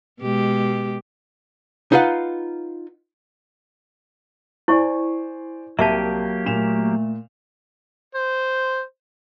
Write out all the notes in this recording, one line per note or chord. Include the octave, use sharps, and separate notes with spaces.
B2 G#3 G4
D#4 F4 B4 F5 F#5
E4 C5 D5 G#5 C#6
C2 F#3 A#3 G4 E5 A5
A#2 A3 E7 F7
C5